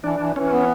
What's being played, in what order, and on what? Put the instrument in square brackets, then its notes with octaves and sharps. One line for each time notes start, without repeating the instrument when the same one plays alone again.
[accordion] E3 [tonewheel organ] D4
[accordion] E3
[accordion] E3 [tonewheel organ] C#4
[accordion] B3